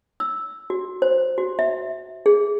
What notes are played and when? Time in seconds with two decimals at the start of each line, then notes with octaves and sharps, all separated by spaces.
0.20 E6
0.70 F#4
1.02 C5
1.38 F#4
1.59 E5
2.26 G#4